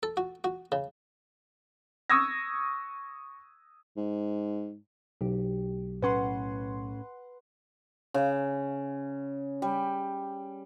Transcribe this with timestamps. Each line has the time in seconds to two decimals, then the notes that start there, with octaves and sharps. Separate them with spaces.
0.03 A4
0.17 F#4
0.44 F#4
0.72 C#3
2.10 C#6 D#6 E6 G#6 A#6
3.97 G#2
5.21 B1 G4
6.02 A2 C#4 B4 F#5 C6
8.14 C#3
9.62 G3